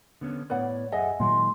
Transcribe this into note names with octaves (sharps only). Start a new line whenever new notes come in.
D3 B3 C#4
A2 B3 B4 C#5 D5 F#5
F#2 G#4 A4 D#5 E5 F#5 G#5
A#2 D#3 F#3 G#3 C6